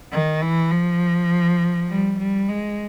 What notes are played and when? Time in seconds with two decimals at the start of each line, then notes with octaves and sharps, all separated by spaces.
0.12 D#3
0.42 E3
0.71 F3
1.89 G3
2.19 G3
2.48 G#3